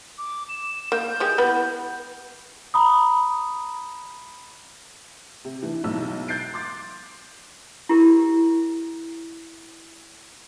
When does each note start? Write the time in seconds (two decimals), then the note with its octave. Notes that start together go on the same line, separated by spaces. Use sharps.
0.18 D6
0.49 E7
0.92 A#3 G6
1.20 G#3 G4 G#4
1.38 B3 E4 B4
2.74 A#5 B5 D#6
5.44 C3
5.63 E3 D4
5.84 B1 G#2 E3 E6
6.28 F#6 G6 A6 C7 D7
6.53 C6 D6 A6
7.89 E4 G4 A#4